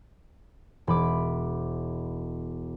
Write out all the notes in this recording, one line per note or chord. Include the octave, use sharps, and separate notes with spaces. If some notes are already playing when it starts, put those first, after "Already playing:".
E1 B5 D6